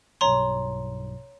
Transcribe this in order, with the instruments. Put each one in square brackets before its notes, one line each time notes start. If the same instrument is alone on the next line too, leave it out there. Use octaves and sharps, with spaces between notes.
[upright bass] B1 G2 [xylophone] C#5 A#5 C6